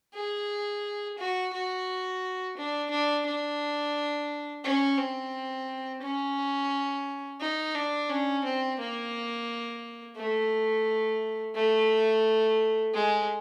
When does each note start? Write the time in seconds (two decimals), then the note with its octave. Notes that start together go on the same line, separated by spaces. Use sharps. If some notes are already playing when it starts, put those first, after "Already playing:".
0.14 G#4
1.18 F#4
1.53 F#4
2.57 D4
2.91 D4
3.26 D4
4.64 C#4
4.98 C4
6.02 C#4
7.40 D#4
7.75 D4
8.09 C#4
8.44 C4
8.80 A#3
10.17 A3
11.55 A3
12.93 G#3